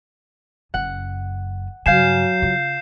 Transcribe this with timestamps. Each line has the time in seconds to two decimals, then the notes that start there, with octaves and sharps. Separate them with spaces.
0.74 F#1 F#2 F#5
1.86 G2 C#3 F#3 F5 G#5 G6 C7 E7
2.42 C#3 F4